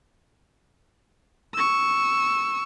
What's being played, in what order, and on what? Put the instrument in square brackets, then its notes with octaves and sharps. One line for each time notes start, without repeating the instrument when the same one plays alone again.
[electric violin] C#6 E6